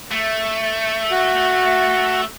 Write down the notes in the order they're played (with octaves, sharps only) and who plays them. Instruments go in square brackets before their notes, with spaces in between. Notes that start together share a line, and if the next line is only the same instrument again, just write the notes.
[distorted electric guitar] A3
[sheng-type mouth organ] F#4